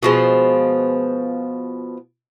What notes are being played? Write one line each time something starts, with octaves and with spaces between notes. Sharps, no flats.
B2 F3 G#3